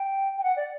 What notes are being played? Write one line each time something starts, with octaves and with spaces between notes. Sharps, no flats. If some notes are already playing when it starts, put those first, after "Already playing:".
Already playing: G5
G5
F#5
D5